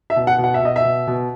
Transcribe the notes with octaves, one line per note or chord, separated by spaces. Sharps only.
E5
B2
F#5
B2
F#5
E5
B2 D#5
E5
B2
B2